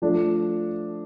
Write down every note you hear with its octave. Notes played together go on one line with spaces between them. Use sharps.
F3 A3 D4